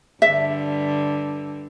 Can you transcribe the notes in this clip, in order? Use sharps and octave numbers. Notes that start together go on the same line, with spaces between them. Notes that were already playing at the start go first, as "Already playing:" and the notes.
G2 D3 E5